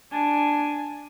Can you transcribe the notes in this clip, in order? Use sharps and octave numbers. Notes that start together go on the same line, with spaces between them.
D4 G#5